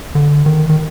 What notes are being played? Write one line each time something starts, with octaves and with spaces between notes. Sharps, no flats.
D3
D#3
D#3